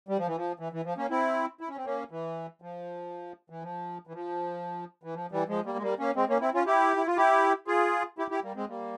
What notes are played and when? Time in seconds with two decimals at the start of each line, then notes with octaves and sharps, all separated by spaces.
0.08 G3
0.18 F3
0.27 E3
0.36 F3
0.59 E3
0.73 E3
0.85 F3
0.98 A#3 C#4
1.10 C4 E4
1.61 E4
1.69 C#4
1.77 C4
1.85 A#3 C#4
2.11 E3
2.62 F3
3.50 E3
3.63 F3
4.07 E3
4.14 F3
5.03 E3
5.15 F3
5.32 E3 G3
5.49 F3 G#3
5.65 G3 A#3
5.78 G#3
5.82 G3 A#3
5.99 A#3 C#4
6.16 G#3 C4
6.29 A#3 C#4
6.41 C4 E4
6.54 C#4 F4
6.66 E4 G4
6.97 E4
7.07 F4
7.17 E4 G4
7.67 F4 G#4
8.18 E4 G4
8.31 E4 G4
8.43 G3 A#3
8.56 G#3 C4
8.69 G3 A#3